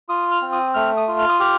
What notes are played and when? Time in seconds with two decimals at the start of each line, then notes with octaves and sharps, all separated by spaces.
0.09 F4 D#6
0.31 F6
0.42 C4
0.52 D#6
0.74 A3 F6
0.97 D#6
1.08 F4
1.19 F6
1.29 D#6
1.40 G4 F6